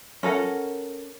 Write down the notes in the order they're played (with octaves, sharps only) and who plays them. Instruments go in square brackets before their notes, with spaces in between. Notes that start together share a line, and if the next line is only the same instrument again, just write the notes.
[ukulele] C#4 A4 A#4 F#5